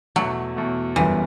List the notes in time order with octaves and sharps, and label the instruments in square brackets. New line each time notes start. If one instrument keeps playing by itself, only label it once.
[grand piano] E2 B2 A3 [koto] F#3
[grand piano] E2 B2 A3
[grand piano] G1 F#2 C#3 G3 B3 [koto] E3